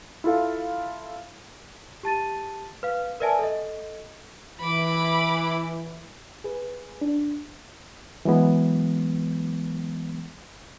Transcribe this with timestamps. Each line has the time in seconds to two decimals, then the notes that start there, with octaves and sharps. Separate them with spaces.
0.24 E4 F4 A4 F5
2.03 G4 A5 A6 D#7
2.83 B4 F5
3.20 A#4 B4 D5 E5 G#5 A5
3.39 A4 D#5
4.61 E3 B5 D6
6.44 G#4 B4
7.01 D4
8.25 E3 F#3 G#3 B3